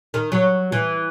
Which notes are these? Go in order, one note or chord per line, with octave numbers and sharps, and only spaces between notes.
D#3
F#3
E3